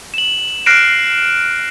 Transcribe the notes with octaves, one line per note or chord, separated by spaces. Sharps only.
E7 F#7
F6 F#6 A#6 C7 D7 E7